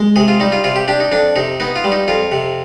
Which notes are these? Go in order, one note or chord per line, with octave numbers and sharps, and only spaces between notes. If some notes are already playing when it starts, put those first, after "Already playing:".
Already playing: G#3
C3 G#4
F4
G3 D#4
F4
C3 F4
G4
D4 G4
D#4
F2 D4
C3 D#4
B3 D#4
F4
G3
D#4
F2 F4
C3